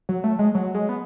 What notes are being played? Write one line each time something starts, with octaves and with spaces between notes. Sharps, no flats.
F#3
A3
G#3
F#3
G#3
B3